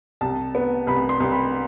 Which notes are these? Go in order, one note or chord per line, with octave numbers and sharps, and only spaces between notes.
C2 A5
B3
C2 B5
C6
C2
B5